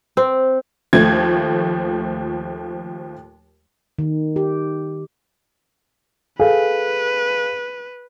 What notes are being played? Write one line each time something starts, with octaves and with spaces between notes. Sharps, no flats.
C4
D#2 F3 A3 G#6
D#3
G4
G#4 A4 B4 F5